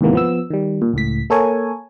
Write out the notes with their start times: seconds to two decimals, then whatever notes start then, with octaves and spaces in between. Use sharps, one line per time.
0.01 D#2 G#2 C3 E3 A#3 B3
0.13 F3 B3 E6
0.50 D#3 G3
0.82 A#2
0.93 C#2 A2 B6
1.30 A#3 A4 A#4 C#5 G#5